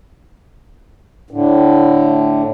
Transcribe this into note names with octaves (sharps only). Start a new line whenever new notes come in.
A2 D3